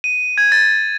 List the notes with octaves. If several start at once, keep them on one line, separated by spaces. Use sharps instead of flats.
D#7
G#6
A6